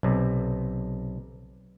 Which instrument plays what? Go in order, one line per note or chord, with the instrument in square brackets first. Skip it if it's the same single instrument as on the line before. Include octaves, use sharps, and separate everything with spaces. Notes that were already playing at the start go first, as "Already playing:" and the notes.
[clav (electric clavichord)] B1 C3